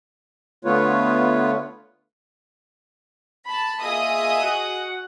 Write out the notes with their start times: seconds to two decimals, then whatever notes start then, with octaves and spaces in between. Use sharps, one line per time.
0.65 D3 A3 B3 F4 B4 C#5
3.46 A5 B5
3.81 A#3 F4 G#4 D#5 E5 D#6
4.42 F#4 F#5